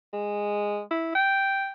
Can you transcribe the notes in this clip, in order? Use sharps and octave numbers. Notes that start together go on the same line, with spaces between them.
G#3
E4
G5